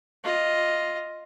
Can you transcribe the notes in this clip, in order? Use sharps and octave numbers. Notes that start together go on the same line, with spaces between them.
F4 D#5